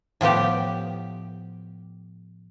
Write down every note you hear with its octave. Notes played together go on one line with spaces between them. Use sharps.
A2 F3 B3 G4